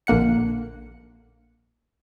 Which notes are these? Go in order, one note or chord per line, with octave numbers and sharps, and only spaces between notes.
A#1 D3 A#3 F#5 C#7